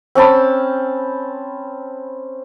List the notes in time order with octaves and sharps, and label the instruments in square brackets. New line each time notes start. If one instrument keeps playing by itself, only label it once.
[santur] C4 C#4 A5 B5